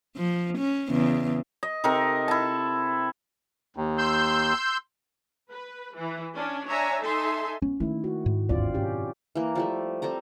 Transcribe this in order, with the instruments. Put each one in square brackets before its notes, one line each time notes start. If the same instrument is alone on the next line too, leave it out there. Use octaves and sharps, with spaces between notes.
[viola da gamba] F3
C#4
E2 C#3
[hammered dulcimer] D#5
C3 D#4 A4 A#4
E4 A5
[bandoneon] D#2
[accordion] C6 E6 G6
[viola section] B4
E3
C#4 D4
D4 C#5 E5 G#5 A#5
D#4 A4 E5 G#5 C6
[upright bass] B3 [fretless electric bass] C#4
[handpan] D#3 E4 [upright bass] A3 A#3
[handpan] F#4
[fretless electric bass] G#2
[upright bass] G1 D#2 [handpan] C4 F4 D5
[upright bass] F#2 B2 [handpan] C#4 G4
[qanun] E3 A#3
F3 G3 A3
G3 C4 A4 A#5